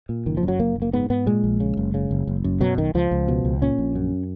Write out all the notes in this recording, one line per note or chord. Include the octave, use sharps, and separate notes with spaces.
A#2
F#1 D#3
F3
F#2
F#3
F#1 A#3
F#1
A#3
G#2 B3
G#2 B3
A#2 G#3
A#1
C#3
F#1
C#3
F#1
F#1
F#2
B2 F#3
B1 D#3
C#2 F3
C#2
B2
C#2
A#2 C#4
A#1
F#2